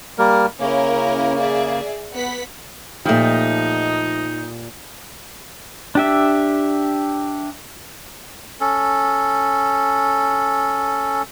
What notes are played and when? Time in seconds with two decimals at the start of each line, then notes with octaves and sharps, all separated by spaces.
0.18 G3 A#3 A#4
0.60 C#3 A#3 C#4 E4 A#4
1.38 G#4 D5 E5
2.14 B3 F#5 B6
3.05 A#2 F3 A3 D#4 G4
5.95 D4 G4 E5
8.61 C#4 A4